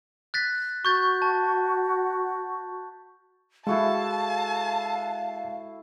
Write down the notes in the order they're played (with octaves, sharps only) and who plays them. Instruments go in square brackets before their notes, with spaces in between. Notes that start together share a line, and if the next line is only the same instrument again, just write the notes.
[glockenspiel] F#6 A6 B6
[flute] F#4 [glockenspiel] C#6 G6 A6
[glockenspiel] A5
[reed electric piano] G#3 [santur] E4 F#4 A4 [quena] F5 [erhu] A5